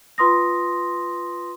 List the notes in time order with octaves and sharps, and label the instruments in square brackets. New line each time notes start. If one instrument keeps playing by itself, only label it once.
[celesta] F4 B4 C6 D#6 A#6